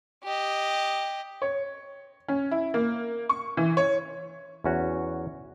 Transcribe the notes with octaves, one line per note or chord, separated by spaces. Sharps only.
G4 D#5
C#5
C#4
E4
A#3
C#6
E3
C#5
E2 C#4 F#4